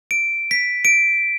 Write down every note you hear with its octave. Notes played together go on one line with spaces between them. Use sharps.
D7
B6
D7